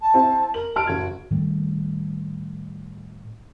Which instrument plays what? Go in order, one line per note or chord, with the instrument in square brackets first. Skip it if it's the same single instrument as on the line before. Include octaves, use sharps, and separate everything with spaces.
[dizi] A5
[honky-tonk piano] C4 E4
[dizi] A#4 [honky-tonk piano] F#7
[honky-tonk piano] A5 F6 D7
[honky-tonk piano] F#1 G#6 [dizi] F#4
[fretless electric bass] A2 D#3 G3 A3